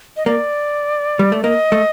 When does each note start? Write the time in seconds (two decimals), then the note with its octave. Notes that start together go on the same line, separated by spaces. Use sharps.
0.17 D#5
0.26 A#3 D5
1.19 G3
1.32 A3
1.43 A#3 D#5
1.72 A3